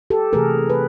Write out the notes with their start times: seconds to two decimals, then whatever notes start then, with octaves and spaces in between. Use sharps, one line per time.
0.10 G4 A4
0.33 C3 E3 A3 G#4 A#4
0.69 B4